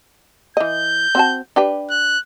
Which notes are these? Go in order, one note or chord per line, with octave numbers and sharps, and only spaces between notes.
E3 D#5 G6
C4 F#4 A5
D4 G4 B4
F#6